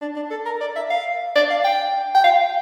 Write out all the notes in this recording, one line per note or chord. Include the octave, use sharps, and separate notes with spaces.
D4
D4
A4
A#4
D5
E5
F5
D5
F5
G5
G5
F5